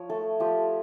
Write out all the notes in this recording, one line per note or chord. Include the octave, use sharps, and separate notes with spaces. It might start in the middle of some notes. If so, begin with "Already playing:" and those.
Already playing: F3 C#5
A3 A4
F3 G4